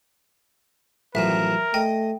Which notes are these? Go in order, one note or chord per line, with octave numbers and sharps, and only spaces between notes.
A1 F#2 F3 A#4 E5
A3 D#5 G5